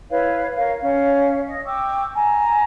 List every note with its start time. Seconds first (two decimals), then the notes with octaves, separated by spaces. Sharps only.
0.10 E4 B4 C#5 F5
0.56 A#4 C#5 F5
0.82 C#4 F5
1.46 D#5
1.65 G5 C#6 D6 E6
2.14 G#5 A#5